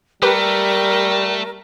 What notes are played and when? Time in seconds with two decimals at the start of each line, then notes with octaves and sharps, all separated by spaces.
0.22 G3 A3 G4 A#4 B4